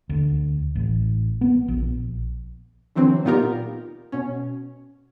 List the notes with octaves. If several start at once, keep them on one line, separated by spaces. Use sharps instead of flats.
D2
A1
B3
A#1
D3 E3 F#3 C4
A#2 B3 D#4 F4 G4 A#4
B2 C#4